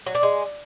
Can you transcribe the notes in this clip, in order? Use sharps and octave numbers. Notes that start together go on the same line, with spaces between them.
F#3
D4
G#3